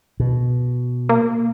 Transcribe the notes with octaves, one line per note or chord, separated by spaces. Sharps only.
B2
A#3